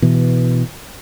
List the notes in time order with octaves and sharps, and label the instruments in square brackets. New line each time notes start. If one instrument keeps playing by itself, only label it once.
[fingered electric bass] B2 E3